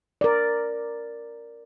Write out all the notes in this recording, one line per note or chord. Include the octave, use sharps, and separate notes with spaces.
A#4 D5